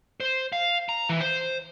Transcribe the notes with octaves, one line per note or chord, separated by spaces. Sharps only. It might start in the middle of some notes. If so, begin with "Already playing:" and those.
C5
F5
A#5
E3
C5